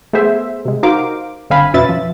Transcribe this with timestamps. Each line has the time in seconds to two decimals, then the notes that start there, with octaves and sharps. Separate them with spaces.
0.13 A3 B3 G#4 C5 E5
0.65 C3 G#3
0.83 D#4 F#4 A#4 C5 F5 D6
1.50 G1 D3 C4 F5 G#5 B5
1.74 F2 B2 C#4 B4 E5 A6
1.89 F3